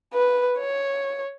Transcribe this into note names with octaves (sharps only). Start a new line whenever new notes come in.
B4
C#5